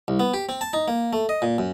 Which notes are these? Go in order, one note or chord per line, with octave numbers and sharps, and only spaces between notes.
C2
B3
G4
C4
A5
D#4
A#3
A3
D#5
A#2
F#2